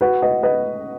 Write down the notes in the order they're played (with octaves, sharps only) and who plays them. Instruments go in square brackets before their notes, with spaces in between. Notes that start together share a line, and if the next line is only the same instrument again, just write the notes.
[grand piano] F#4 B4
B4 D#5
B4 D#5